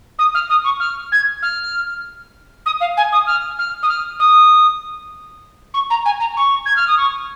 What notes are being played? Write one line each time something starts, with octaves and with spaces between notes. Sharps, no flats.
D#6
F6
D#6
C#6
F6
G#6
F6
D#6
F5
G#5
D#6
F6
F6
D#6
F6
D#6
C#6
A#5
G#5
A#5
C#6
G#6
F6
D#6
C#6